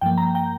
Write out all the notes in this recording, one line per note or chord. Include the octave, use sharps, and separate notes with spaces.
G2 F3 A#3 G5
A#5
G5